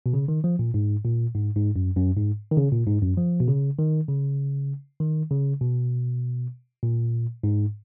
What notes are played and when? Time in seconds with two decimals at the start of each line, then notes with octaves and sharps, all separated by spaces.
0.06 B2
0.14 C#3
0.28 D#3
0.44 F3
0.59 A#2
0.74 G#2
1.05 A#2
1.35 G#2
1.56 G#2
1.76 F#2
1.96 F#2
2.16 G#2
2.51 D#3
2.57 C#3
2.72 A#2
2.87 G#2
3.02 F#2
3.17 F3
3.40 B2
3.48 C#3
3.78 D#3
4.08 C#3
5.00 D#3
5.31 C#3
5.61 B2
6.83 A#2
7.44 G#2